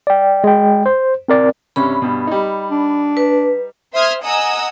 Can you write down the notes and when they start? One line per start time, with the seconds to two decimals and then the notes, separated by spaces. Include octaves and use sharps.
0.07 D5 G5
0.44 G#3 G5
0.86 C5
1.28 C4 A#4 D5
1.76 G2 C3 C#4 B5
2.02 G2 B2
2.27 G3 D#4
2.71 D4
3.17 B4
3.93 C5 E5 C6 D#6 F6 G#6
4.23 D#5 F#5 G#5 A#5 D#6 E6